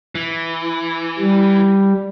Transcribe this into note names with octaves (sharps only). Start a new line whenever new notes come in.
E3
G3